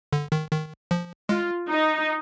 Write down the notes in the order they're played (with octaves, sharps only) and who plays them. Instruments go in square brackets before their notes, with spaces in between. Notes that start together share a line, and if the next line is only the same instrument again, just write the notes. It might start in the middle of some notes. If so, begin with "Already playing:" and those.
[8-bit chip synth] D3
D#3
D#3
F3
[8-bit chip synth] G#3 [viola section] F4
[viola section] D#4